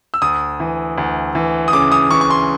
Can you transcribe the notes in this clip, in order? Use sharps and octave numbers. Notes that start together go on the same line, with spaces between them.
E6
D2 D#6
E3
D2
E3
D#6
C#3 D6
D#6
E3 C#6
C#6
C6